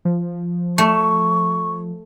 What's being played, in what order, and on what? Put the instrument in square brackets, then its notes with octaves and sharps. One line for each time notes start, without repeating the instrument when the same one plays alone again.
[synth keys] F3
[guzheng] A3 [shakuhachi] C#6